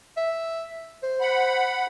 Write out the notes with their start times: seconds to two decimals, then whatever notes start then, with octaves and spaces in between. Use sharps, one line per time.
0.17 E5
1.03 C5
1.21 F#5 B5